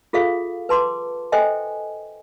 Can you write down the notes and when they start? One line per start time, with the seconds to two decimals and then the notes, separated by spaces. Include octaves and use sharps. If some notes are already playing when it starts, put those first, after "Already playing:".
0.13 F4 G#4 A4 E5 F5
0.69 B4 A5 C6 D6
1.32 A4 C5 D#5 E5 G5 G#5